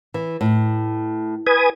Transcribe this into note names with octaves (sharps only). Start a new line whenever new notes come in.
E3
A2
B4 G#5 D#6